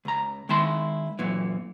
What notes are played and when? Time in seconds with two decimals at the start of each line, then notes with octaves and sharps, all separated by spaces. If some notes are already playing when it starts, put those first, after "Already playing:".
0.05 C#2 A#5
0.49 D#3 G#3 E4 A5 C6
1.19 F#2 A#2 E3